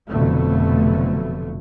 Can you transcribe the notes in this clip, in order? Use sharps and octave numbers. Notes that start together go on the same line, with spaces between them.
F1 F2 B2 D3 F#3 A3